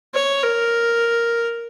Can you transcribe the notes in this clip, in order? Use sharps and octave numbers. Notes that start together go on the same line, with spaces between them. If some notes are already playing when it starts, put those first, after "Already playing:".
C#5
A#4